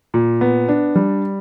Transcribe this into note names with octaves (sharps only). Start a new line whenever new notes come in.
A#2
B3
D4
G3